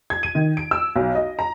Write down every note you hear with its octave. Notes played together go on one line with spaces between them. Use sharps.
G#6
D#7
D#3
D7
E6
B1
D#5
A#5